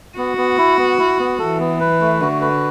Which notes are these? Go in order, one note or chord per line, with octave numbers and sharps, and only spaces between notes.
B3 F#4
B3
E4
B3
E4
B3
E3 A4
B3
B4
A3
D3 F#4
B4